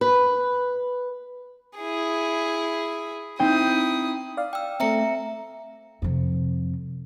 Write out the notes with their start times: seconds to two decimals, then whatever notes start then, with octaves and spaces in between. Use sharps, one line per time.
0.01 B4
1.78 E4 G#4
3.40 C4 D#4 E4 G5 D#6
4.37 D5 F5
4.53 G5 E6
4.80 A3 C4 E5 A#5 C#7
6.02 F2 C3